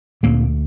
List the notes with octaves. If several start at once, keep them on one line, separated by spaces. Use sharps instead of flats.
D2 A#2 D3 A#3